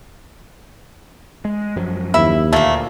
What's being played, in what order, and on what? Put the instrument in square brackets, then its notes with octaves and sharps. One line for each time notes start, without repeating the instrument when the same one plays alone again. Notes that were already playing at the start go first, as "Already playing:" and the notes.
[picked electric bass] G#3
F#2 F3 F#3
[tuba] D#2 [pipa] E4 [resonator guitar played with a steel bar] E5
[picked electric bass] D2 [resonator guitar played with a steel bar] A#2 A#3 [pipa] A3